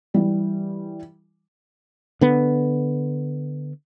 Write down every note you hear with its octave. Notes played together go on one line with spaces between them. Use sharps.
E3 G3
D3 B3